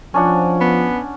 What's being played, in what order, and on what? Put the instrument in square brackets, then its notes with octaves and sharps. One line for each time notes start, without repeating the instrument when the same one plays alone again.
[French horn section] F3 [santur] C#4 D4 F#5
[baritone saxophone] B3